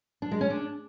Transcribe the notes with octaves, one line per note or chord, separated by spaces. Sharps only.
D4
G#3
C#4
D4